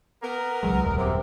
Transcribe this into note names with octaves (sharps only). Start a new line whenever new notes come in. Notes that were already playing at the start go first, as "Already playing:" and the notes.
B3 A#4
C#2 F#3 G#3
D#1 F#2
C3